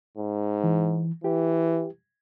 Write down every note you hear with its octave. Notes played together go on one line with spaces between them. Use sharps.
G#2
E3
E3 G4